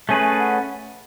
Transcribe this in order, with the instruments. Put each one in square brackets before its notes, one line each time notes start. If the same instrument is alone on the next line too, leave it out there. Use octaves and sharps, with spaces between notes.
[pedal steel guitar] A3 C#4 G#4 B4 [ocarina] G#5
[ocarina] F#5